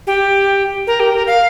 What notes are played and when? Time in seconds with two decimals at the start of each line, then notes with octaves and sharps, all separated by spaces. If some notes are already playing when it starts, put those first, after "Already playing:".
0.07 G4
0.87 A#4
1.00 G4
1.14 A#4
1.27 F5